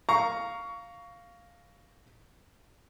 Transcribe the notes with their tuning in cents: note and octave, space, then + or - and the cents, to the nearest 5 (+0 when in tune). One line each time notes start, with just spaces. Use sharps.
F5 +0 A#5 +0 C#6 +20